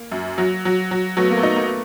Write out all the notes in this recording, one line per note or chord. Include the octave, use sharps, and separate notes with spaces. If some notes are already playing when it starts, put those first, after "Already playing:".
Already playing: A#3
F#2
F#3
F#3
F#3
F#3 A3 B3
A#3
A3 B3
D#4
A#3
B3